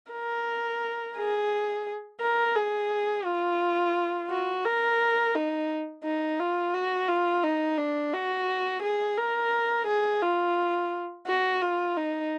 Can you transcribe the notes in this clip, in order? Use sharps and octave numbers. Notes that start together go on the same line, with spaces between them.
A#4
G#4
A#4
G#4
F4
F#4
A#4
D#4
D#4
F4
F#4
F4
D#4
D4
F#4
G#4
A#4
G#4
F4
F#4
F4
D#4